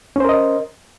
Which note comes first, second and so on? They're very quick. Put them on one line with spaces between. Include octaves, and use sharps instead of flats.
C#4 C5 A#4 D#5